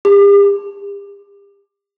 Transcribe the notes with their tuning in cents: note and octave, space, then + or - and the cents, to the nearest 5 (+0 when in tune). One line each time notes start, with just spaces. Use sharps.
G4 +40